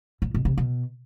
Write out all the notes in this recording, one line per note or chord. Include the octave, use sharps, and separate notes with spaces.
A#2
B2
C3
B2